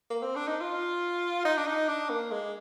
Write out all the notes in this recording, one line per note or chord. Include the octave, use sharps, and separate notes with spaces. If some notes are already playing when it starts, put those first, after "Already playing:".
A#3
C4
D4
D#4
F4
D#4
D4
D#4
D4
A#3
G#3